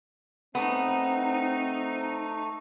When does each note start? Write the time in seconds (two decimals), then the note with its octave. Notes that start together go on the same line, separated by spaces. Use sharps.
0.55 A3 B3 C4 D#4